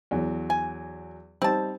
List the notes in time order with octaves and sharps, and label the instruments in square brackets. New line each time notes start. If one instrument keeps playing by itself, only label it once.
[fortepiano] E2 F#3
[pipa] G#5
[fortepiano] G3 D#4 C5 [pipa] C4 A5